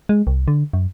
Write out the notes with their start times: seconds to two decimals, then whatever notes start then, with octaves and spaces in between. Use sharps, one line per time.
0.09 G#3
0.27 C2
0.48 D3
0.73 F#2